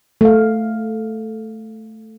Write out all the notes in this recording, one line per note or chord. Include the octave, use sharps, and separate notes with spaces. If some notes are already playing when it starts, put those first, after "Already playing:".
A3 F5